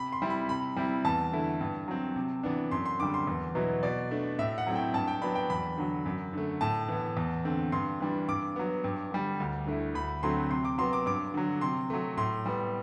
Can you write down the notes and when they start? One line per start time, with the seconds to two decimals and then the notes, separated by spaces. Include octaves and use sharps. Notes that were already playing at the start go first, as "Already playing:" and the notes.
Already playing: C3 B5
0.12 C6
0.22 G3 C4 E4
0.30 B5
0.49 C3 B5
0.76 G3 C4 E4
1.05 E2 A5
1.33 D3 A3 E4
1.61 G2
1.88 F#3 C4
2.16 C3
2.43 E3 B3 D4
2.71 F#2 C6
2.86 C6
3.00 D3 G3 D6
3.14 C6
3.27 E2
3.55 B2 F#3 B3 E4
3.83 B2 D5
4.11 A3 D4
4.38 A2 E5
4.58 F#5
4.67 F#3 A3 C4 E4
4.76 G5
4.94 G2 A5
5.08 G5
5.22 F#3 B3 D4 B5
5.35 G5
5.50 E2 B5
5.78 D3 F#3
6.06 F#2
6.33 D3 A3
6.61 A2 A5
6.89 E3 B3
7.17 E2
7.45 D3 A3 C4
7.72 G2 C6
8.00 E3 G3 D4
8.28 G2 D6
8.56 F#3 B3
8.84 G2
9.12 D3 G3
9.40 D2
9.67 D3 A3 E4
9.95 D2 B5
10.23 D3 F#3 A3 C4 C6
10.50 C3 C6
10.65 D6
10.78 F#3 B3 C6
10.93 D6
11.06 G2 D6
11.34 D3 F#3
11.61 C3 C6
11.90 F#3 A3
12.17 A2 C6
12.46 G3 B3